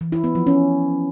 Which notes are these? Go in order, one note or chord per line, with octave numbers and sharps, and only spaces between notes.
E3
E4
B3
F3
C#4